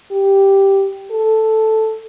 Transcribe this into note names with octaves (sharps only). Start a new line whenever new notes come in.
G4
A4